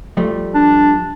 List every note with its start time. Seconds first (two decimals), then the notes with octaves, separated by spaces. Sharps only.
0.17 F3 G3 A3
0.55 D4